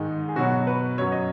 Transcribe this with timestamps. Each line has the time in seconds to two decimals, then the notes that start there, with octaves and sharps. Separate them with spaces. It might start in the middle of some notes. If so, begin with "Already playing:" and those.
Already playing: G#2 D#3 G#3 D#4
0.28 G#4
0.36 B2 F#3 F#4
0.67 B4
0.98 F#2 F#3 C#5
1.12 D#5